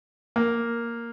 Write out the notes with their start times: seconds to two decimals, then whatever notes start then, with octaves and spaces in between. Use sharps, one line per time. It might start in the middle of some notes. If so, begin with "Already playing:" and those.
0.36 A#3